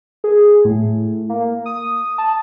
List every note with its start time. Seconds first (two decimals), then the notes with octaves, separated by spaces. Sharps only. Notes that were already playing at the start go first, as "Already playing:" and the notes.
0.24 G#4
0.65 A2
1.29 A#3
1.66 D#6
2.18 A5